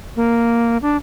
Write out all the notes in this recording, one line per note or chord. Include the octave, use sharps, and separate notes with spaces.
A#3
D4